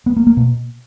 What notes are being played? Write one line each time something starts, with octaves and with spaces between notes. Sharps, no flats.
B3
A#3
A#3
B2